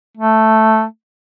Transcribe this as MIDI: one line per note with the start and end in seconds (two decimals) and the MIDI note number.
0.17 0.84 57